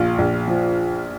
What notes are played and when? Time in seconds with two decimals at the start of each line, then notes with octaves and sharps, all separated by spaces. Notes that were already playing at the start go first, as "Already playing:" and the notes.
Already playing: A#1 F4
0.18 A#1
0.48 F3